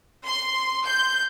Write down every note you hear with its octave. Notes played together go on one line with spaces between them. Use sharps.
C6
G6